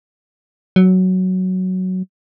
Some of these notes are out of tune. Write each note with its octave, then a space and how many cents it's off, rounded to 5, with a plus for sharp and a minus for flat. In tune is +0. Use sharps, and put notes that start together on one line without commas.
F#3 +5